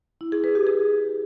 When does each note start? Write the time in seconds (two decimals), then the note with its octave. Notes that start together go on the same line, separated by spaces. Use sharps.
0.21 E4
0.32 G#4
0.44 B4
0.55 G4
0.67 G#4